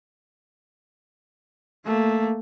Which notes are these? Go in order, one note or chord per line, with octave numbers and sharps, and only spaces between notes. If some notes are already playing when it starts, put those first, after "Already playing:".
A3 A#3